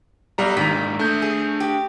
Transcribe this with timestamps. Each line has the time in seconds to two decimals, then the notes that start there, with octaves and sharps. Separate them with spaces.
0.38 B1 G3 A#5
0.57 G#2 D#3 A#3 D4 A#5 B6
0.99 A3 D4 E5 G6
1.22 G#4
1.60 G4